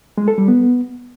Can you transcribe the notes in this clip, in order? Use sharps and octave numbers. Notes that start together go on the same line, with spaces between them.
G#3
A4
G3
B3